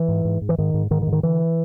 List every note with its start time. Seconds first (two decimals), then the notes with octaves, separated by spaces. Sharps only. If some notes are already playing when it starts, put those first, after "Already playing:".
Already playing: E3
0.08 G#2
0.25 G#2
0.41 G#2
0.49 E3
0.58 G#2 D#3
0.74 G#2
0.91 G#2 D#3
1.02 D#3
1.07 G#2
1.12 D#3
1.23 D3 E3